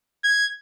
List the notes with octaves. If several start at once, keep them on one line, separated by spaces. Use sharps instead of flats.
G#6